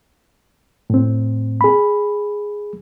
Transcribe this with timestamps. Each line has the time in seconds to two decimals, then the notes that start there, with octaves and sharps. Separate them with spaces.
0.90 A2 C4
1.61 G#4 B5